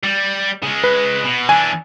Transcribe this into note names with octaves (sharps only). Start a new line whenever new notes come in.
G3
C#3 G#3
B4
B2
E3 D4 G#5